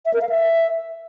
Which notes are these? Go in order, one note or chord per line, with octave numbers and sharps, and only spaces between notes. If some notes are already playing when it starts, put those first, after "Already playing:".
E5
A#4
F5
E5